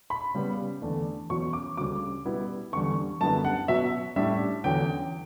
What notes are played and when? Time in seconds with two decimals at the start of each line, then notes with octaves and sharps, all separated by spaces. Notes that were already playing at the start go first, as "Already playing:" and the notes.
0.10 B5
0.34 C#3 G3 B3
0.82 E2 D3 A3 D4
1.30 E2 B2 F#3 C#4 C#6
1.53 D6
1.77 D2 C#3 G3 D6
2.25 B2 G3 B3 E4
2.73 E2 D3 G3 C#6
3.21 F#2 D3 G3 B3 E4 A5
3.45 F#5
3.68 B2 F#3 B3 E5
4.16 A2 G3 D4 E5
4.64 E2 D3 F#3 C#4 G5